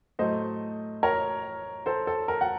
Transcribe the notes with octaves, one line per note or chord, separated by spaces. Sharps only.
A2 F#3 A3 C5 D#5
A#4 C#5
A4 C5
A4
A#4
F#5